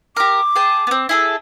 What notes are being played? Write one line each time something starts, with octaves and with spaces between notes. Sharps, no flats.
G4 A#4 D6
G#4 G5 A5
B3 C4
E4 G#4 A4